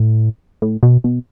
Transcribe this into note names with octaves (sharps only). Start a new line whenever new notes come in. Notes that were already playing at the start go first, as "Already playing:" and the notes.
Already playing: A2
A2
B2
B2